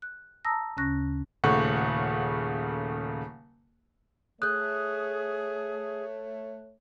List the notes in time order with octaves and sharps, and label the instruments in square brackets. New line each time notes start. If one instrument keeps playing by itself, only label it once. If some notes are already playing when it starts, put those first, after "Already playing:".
[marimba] F#6
A5 A#5 D#6 E6 A#6
D2 C#3 C#4 C#6 F#6 A#6
[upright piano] D#1 C#3 A3 F#5 C#6
[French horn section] A3 C#5 [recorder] G#4 [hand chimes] D#6 G6 [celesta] F#6